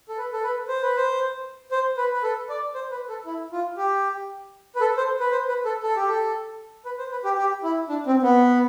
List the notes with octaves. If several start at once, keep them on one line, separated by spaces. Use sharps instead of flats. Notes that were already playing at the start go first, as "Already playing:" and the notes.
A4
B4
A4
B4
C5
B4
C5
C5
B4
B4
A4
D5
C5
B4
A4
E4
F4
G4
B4
A4
C5
B4
C5
B4
A4
A4
G4
A4
B4
C5
B4
G4
G4
E4
D4
C4
B3